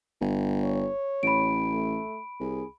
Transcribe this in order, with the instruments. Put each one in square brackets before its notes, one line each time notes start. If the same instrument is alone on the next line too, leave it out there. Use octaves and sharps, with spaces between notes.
[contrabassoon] G1
[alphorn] C#5
[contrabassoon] A1 [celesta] B5 D7
[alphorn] A3
[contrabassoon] C2 [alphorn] G#4